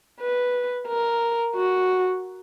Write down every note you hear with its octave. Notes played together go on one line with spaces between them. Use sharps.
B4
A#4
F#4